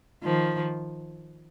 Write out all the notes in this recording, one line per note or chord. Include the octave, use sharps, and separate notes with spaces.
D#3 F3